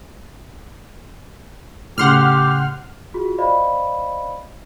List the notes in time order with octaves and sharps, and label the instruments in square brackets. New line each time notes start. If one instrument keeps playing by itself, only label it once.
[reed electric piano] A2 C#3 [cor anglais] G4 [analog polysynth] F#5 C6 F6
[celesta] F4 F#4 G#4
C5 D5 D#5 F5 B5